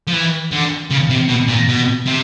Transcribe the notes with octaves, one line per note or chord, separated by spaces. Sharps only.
F3
E3
D3
C#3
C3
B2
A#2
B2
C3